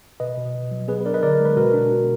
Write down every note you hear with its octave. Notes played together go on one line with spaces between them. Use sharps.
B2 B4 D#5
B2
B2
F#3
B3 G#4 B4
B4
D4 A#4 D5
B4 D#5
D3 A#4 D5
G#3
B4
B2 F#4 A#4
D4
B2